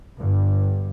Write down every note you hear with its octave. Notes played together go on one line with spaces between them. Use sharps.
G1 G2